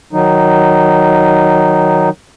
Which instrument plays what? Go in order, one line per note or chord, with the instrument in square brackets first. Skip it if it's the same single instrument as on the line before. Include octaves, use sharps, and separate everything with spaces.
[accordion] D#3 F#3 D#4